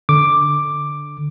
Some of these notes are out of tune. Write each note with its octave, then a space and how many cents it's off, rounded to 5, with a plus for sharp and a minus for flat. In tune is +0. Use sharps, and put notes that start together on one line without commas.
D3 -5 D6 +5